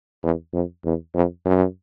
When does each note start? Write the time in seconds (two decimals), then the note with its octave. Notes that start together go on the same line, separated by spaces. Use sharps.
0.23 E2
0.53 F2
0.85 E2
1.15 F2
1.45 F#2